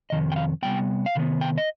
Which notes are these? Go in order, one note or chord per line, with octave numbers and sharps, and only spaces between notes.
F2 C3 D#3 D#5
G5
F5
C3 G3 B3 G5
F5
C3 D#3 B3
G5
D#5